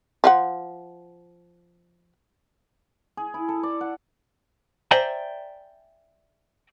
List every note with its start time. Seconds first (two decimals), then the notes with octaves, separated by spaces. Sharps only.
0.24 F3 F5 F#5
3.17 G#4
3.34 E4
3.49 A4
3.63 D5
3.81 F#5
4.91 C5 D5 E5 G5 G#5 A#5